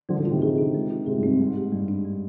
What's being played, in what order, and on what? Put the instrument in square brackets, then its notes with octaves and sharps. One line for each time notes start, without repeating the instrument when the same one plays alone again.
[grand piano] D3 F3 [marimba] G3
[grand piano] D3 F3
[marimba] F4
[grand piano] C3 D#3
[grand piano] C3 D#3 [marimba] G#4
[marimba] D4
G#3
F4
[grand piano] G#2 C3 [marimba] G#4
[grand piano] G2
[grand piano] G#2 [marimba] C4
[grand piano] G#2 [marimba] G3
[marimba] G4
[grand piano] G2 [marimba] G3
[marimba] D4
G3